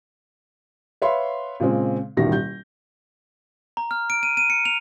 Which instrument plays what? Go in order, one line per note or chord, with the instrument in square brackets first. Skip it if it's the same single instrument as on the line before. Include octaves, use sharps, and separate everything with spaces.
[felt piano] B4 C#5 E5 F5 B5 C6
A#2 C#3 G#3 C4
D#1 A1 B2 D#3 G3 A#6
G6
[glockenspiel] A#5
F6
D7
D#7
D#7
C#7
F7